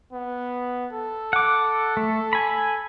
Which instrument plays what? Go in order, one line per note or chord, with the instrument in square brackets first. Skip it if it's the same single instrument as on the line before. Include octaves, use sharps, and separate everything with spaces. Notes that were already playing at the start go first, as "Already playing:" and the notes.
[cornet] B3
A4
[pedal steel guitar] F#5 D6
A3
G#5 B5